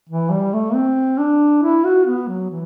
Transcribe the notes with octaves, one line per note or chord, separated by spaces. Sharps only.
E3
G3
A3
C4
D4
E4
F#4
B3
F#3
E3